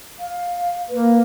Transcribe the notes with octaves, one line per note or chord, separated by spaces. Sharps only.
F5
A#3 B4